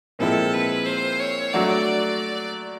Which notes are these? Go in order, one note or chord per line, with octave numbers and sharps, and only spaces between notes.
A#2 F3 G#3 C4 E4 A4
B4
C5
C#5
F#3 A3 D4 F#4 D5